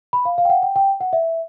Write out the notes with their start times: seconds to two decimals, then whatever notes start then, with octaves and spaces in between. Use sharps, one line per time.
0.13 B5
0.25 F5
0.38 F5
0.45 G5
0.50 F#5
0.63 G5
0.76 G5
1.01 F#5
1.13 E5